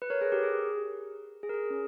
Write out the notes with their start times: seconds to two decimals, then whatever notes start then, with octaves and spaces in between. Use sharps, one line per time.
0.02 B4
0.10 A#4 C#5
0.21 G#4 B4
0.32 G4 A#4
0.43 G#4
1.43 G#4
1.49 A#4
1.54 G#4
1.70 C#4